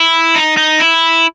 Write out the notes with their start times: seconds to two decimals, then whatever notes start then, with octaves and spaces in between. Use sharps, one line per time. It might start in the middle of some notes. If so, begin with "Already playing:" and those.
Already playing: E4
0.36 D#4
0.57 D#4
0.80 E4